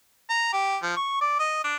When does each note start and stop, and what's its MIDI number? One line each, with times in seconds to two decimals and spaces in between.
0.30 0.49 82
0.53 0.77 67
0.83 0.93 53
0.97 1.21 85
1.21 1.36 74
1.40 1.62 75
1.64 1.76 62